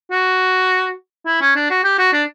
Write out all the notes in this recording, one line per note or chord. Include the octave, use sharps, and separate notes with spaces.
F#4
E4
C#4
D4
F#4
G4
F#4
D4